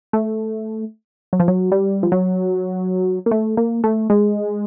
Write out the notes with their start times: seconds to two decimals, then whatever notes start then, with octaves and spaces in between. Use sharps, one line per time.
0.13 A3
1.33 F#3
1.40 F3
1.48 F#3
1.72 G3
2.03 F3
2.12 F#3
3.26 A#3
3.31 A3
3.57 A#3
3.84 A3
4.10 G#3